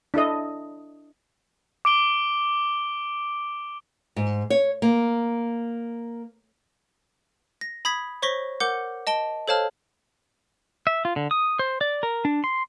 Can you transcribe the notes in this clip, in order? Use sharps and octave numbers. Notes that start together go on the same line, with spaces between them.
D4 E4 A4 D#5
D6 D7 G7
G#2
C#5
A#3
A#6
B5 D#6 G#6 B6
C5 C#5 C#6 A#6 B6 G7
A#4 F#5 D6 G6 C#7 G7
D#5 A5 D7 G7
A4 C5 C#5 F5 A5 F6
E5
F4
D3
D#6
C5
D5
A#4
D4
C6